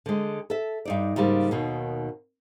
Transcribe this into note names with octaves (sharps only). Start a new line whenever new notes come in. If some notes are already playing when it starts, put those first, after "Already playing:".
D3 G#3
A4 E5
G2 D#4 D5
G#2 C#3 G3 A#3
D#2 B2 D#3